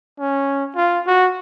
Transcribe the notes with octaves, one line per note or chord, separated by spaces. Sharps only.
C#4
F4
F#4